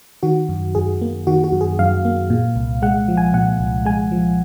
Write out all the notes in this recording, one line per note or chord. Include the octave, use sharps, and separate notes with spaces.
D#3 F#4
F#2
F#2 G#4
A#3
D#3 F#4
F#4
F#2
G#4
F#2 F5
A#3
A#2
C2
G#3 F#5
F3
G#5
A#2 F#5
C2
G#3 G#5
F3